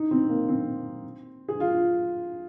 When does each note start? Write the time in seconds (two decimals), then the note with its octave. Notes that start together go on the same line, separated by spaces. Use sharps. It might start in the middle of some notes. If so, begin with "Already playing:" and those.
Already playing: D#4
0.11 C4
0.29 A#3
0.48 C4
1.48 G#4
1.60 F4